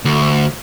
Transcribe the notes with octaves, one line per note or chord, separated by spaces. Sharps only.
D2